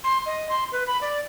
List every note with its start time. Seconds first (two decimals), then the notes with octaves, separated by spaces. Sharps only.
0.04 C6
0.26 D#5
0.49 C6
0.72 B4
0.87 B5
1.01 D5